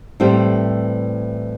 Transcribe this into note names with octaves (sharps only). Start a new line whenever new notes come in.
A2 E3 G3 C4